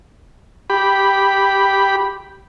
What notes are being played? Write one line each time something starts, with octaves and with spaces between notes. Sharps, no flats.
G4 B5